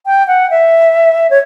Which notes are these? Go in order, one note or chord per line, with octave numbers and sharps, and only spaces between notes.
G5
F#5
E5
C#5